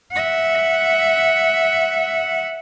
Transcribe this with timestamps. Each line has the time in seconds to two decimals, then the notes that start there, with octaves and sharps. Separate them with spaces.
0.12 E5 F#5